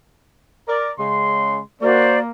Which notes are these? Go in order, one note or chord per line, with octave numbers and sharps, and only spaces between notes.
A#4 D5
C#3 G#3 C6
A#3 F#4 C5 D5